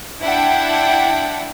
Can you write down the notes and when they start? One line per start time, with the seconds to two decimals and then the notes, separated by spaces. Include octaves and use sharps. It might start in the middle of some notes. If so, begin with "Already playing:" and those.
0.21 D4 E4 F#5 G5